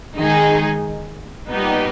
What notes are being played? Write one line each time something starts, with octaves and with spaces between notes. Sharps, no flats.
D#3 G#3 D#4 G#4
A#2 G3 B3 D#4 G4